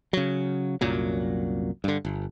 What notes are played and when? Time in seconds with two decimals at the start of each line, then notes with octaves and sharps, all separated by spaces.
0.13 C#3 F#3
0.81 C2 F#2 A#2 F#3
1.84 G2 D3
2.05 G1